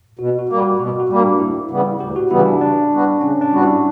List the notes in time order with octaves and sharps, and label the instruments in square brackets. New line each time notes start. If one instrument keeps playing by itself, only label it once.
[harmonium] B2 [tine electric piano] F#4
[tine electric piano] F#4
[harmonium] G3 A#3
[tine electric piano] F#4
[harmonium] B2 [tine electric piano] F#4
[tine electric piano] F#4
[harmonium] G3 A#3
[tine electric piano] D4
[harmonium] D2 [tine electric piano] E4
[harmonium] C#3 E3 G3 B3
[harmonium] D2 [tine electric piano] G4
[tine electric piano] F#4
[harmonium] C#3 E3 G3 B3 [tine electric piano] E4
[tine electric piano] D4
[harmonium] C#3 [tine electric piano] D4
[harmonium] G3 B3 F#4
[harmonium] C#3 [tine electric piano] C#4
[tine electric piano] D4
[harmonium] G3 B3 F#4
[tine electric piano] E4